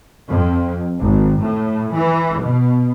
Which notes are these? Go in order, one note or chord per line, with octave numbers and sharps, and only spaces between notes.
F2
G#1
A2
E3
B2